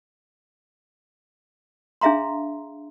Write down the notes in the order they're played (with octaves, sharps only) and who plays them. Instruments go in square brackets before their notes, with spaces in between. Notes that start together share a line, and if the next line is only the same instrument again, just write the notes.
[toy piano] D4 G#4 E5 F5 A#5 C6